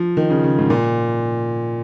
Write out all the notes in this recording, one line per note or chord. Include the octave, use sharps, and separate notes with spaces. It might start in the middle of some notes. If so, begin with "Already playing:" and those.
Already playing: F3
D#3
C#3
C#3
G#2
A#2